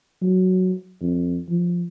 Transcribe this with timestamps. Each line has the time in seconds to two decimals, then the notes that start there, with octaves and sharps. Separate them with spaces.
0.22 F#3
1.02 F2
1.49 F3